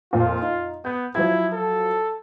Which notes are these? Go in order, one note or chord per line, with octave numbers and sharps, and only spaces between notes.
F2 A#2 F4
D#4
B3 G6
F3 F#3 E4 G#6
A4